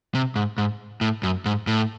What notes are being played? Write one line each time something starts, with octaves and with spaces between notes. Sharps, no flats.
C3
G#2
G#2
A2
F#2
G#2
A2